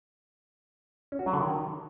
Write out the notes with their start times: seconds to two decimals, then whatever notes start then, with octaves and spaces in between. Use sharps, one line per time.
1.12 C#4
1.19 F#4
1.26 F#3
1.33 D3
1.40 D#3